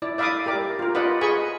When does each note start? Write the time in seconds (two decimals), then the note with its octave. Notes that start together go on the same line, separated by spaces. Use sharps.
0.02 E4 D5
0.18 D5 E5 F5 B5 D6 D#6
0.46 G4 A#4 D5 D6
0.79 F4 A#4
0.95 F4 B4 D5 D#5 F#5 B5
1.21 G#4 D#5 G#5 B5 C#6